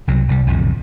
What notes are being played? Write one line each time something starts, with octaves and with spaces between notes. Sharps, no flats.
C2 C3 F#3
C2 F3 G3
B1 F2 A2 D3